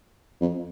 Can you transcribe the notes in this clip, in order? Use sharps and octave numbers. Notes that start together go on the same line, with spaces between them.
F2